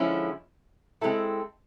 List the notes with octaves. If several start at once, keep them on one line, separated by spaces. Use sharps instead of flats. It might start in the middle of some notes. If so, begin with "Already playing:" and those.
Already playing: D3 F3 G#3 C#4 E4
G#3 C4 E4 A4